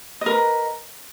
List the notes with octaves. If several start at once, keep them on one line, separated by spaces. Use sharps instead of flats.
A#4 B4 D#5